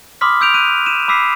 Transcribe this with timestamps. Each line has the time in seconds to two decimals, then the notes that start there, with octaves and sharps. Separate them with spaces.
0.21 B5 C6 D6 D#6 F6 B6
0.41 E6 G6 D7 F7
0.54 F#6 D#7
0.86 D#7 E7
1.08 B5 D6 E6 B6 C7